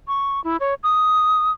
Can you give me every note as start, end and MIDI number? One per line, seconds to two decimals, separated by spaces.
0.08 0.43 85
0.44 0.57 64
0.60 0.74 73
0.83 1.51 87